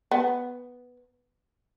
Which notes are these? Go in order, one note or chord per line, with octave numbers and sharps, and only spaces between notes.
B3